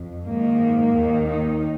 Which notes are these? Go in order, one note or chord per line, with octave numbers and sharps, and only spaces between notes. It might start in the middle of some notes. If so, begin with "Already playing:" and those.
Already playing: F2
G#2 D#3 A#3
D#2 D#3
D#4